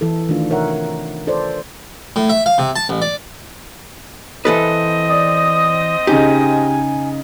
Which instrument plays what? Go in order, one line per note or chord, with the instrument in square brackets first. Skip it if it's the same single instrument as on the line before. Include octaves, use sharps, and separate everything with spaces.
[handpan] E3 E4 A4
D#3 A3 D4 F4
C3 A#4 C#5 E5 F#5
F4 A4 B4 C5 D5
[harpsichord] A2
E5
F5
C3
A5
A1
D5
[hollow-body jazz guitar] E3 A4 B4 [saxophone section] C4 D#5
[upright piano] D5 [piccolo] D#6
[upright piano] C#3 D#4 [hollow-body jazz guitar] G4 [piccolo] G#5